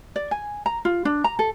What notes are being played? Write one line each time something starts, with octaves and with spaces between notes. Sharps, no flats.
D5
G#5
A#5
F4
D4
A#5
A4